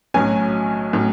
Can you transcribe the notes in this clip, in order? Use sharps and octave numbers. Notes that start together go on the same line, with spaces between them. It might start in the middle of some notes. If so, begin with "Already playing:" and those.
B1 A2 F#3 C#4 G#5
A2 F#3 C#4